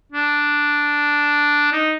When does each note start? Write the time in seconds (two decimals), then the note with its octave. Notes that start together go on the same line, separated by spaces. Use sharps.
0.12 D4
1.72 D#4